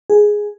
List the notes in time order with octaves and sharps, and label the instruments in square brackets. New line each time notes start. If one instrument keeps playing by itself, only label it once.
[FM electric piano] G#4